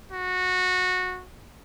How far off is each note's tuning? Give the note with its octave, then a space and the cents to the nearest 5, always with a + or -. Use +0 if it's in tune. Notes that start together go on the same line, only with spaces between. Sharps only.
F#4 -15